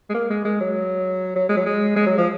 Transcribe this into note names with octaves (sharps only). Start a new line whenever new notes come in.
G#3
A#3
G#3
G#3
F#3
F#3
G#3
F#3
G#3
G#3
F#3
F3